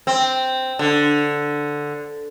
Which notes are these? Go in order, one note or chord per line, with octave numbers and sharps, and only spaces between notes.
C4
D3